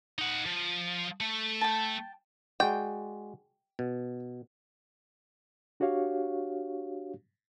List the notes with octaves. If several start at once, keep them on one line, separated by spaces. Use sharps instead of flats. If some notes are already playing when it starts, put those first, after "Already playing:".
D#4 F#5
F3
A3
G5 A5
G#3 F#4 D5 G5
B2
D4 F#4 G4 C#5 F5